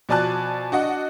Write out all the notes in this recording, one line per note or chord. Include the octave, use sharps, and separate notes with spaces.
B2 F3 D5 G#5 A5 F#6
D4 F#4 D#5 F#5